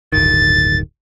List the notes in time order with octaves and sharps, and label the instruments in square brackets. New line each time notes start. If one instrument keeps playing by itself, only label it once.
[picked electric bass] D1 G1 D#3 [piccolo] A6